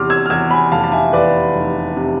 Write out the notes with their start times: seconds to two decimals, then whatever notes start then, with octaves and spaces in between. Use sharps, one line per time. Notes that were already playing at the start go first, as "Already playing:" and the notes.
Already playing: E2 C3 C6 D6 F6
0.10 E6 G#6
0.26 F6
0.30 E2 E6 G#6
0.51 G#5 B5
0.72 F1 F5 A5
0.84 A5
0.92 E5 G#5
1.13 E2 B4 D5
1.55 F1
1.96 C3